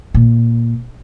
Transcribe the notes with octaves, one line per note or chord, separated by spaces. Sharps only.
A#2